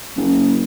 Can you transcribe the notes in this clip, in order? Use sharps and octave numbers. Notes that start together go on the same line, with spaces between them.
F#1